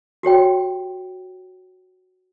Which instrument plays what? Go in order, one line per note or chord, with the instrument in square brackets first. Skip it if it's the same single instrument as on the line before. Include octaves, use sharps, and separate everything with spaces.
[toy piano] F#4 G4 C#5 G5